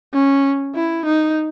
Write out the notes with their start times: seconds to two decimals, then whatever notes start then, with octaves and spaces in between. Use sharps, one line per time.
0.14 C#4
0.75 E4
1.05 D#4